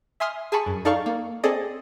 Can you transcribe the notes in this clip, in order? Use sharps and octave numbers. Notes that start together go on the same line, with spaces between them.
E5 G#5 C6 D#6 F6
G#4 G#5 A5 B5 C#6
F#2
D#4 A4 D5 F5 A#5 C#6
A#3
C4 G#4 A4 D5 D#5